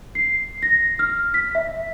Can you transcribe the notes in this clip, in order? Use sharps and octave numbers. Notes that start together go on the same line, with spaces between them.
C7
A#6
F6
B6
E5